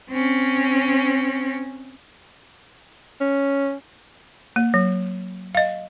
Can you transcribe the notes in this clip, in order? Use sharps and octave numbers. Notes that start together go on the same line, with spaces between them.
C4 C#4
C#4
A#3
F#3
D#5 F5